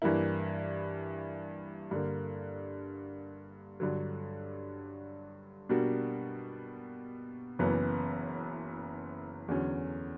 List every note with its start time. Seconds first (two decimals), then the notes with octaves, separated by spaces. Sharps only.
0.02 G2 E3 A#3 E4
1.91 G2 D3 A#3
3.80 G2 D3 F#3
5.69 B2 G3 A#3 D4 F#4
7.59 F#1 F#2 E3 B3
9.48 E2 D3 F#3 C#4